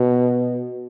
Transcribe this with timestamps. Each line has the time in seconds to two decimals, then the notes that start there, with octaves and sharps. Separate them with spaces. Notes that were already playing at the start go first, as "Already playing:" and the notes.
Already playing: B2